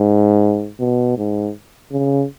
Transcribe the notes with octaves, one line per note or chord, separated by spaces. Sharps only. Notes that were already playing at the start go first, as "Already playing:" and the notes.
Already playing: G#2
B2
G#2
C#3